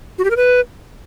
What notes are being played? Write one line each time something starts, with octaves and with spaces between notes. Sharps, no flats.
F#4
G4
A#4
B4